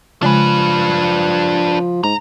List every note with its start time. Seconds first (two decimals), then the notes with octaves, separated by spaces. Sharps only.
0.22 C#3 F3 G#3 D4 B4
2.04 G#2 A#5